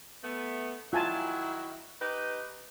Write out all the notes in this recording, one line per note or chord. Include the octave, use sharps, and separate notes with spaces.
A3 B3
D#3 F#3 E4 F4 G#5 A5
D#4 G4 B4